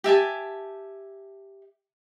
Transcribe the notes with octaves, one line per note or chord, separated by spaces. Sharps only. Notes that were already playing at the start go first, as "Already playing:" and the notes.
G4 E5 G#5 A5